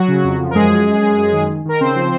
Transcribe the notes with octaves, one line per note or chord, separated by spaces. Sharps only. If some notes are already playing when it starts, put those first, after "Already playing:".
Already playing: F#3 F#4
C#3
F2
F3
A#4
F#2 G#3 G#4
F#2
F#2
F#2
F#2
D#3
D#3
D#3 A#4
C#3 C4 C5
F3